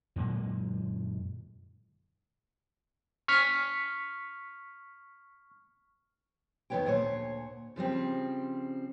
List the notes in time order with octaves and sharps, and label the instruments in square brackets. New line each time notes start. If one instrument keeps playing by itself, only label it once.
[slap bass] F#2 A#2 D3 G#3
[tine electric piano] C#6 F6 B6
[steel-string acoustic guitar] F2 D#3 G#3 B3 C#5 G5
D2 A#2 A3 C5 C#5
C#3 F3 G3 C4